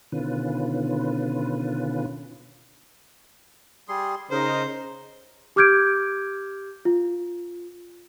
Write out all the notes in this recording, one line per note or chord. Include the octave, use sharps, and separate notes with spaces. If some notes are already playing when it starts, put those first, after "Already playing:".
B2 D3 D#3 C#4 F4 B4
G3 G#4 C6
C#3 D#4 A#4 C5
G4 D6 F6 G6 G#6 D7
F4